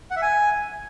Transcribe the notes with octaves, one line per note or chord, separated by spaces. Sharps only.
F#5
E5
G#5